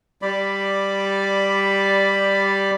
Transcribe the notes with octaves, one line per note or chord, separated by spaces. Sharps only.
G3 D5 B5